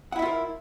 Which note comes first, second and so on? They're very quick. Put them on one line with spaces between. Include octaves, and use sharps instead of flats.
F#5 E4 E5 F4 A#4